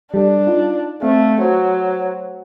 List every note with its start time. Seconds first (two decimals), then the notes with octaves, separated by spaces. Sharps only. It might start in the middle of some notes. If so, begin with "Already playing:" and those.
0.14 G3 D4 A4 D5
0.47 D#4 F4
1.02 A3 C4 F5
1.41 F#3 F#4 C5